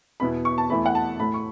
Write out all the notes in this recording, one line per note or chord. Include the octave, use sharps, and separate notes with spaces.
E2 B2 B3 E4 B5
C#6
A5
E2 E3 A3 E4 B5
F#5
A5
A2 A3 E4 B5
C#6